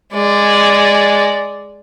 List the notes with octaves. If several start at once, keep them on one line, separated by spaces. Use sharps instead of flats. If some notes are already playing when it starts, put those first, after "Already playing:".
G#3 D5